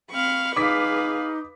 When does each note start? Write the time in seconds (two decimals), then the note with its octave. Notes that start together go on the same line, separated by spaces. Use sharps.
0.10 C4 F5 B5 C#6
0.56 D#4 G#4 B4 F5 D6 B6